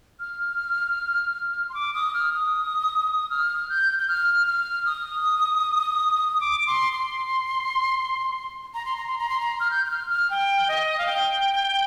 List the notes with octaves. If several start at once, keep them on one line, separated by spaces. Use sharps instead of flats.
F6
C6
D6
D#6
F6
D#6
F6
G6
G6
F6
F6
D#6
D6
C6
C6
A#5
C6
A#5
C6
A#5
C6
A#5
F6
G6
G6
F6
F6
G5
D#5
F5
G5